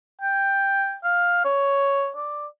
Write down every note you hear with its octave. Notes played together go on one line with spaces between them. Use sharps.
G5
F5
C#5
D5